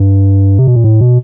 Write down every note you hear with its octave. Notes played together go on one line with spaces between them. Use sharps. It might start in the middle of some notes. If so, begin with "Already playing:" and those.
Already playing: G2
C3
B2
A#2
A2
B2